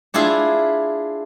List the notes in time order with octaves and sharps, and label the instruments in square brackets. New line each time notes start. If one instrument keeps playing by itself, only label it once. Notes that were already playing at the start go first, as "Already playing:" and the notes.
[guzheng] D4 E4 F4 G#4 E5